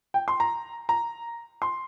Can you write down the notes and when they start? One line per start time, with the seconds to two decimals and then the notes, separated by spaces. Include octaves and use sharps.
0.14 G5
0.28 C6
0.40 A#5
0.89 A#5
1.62 C6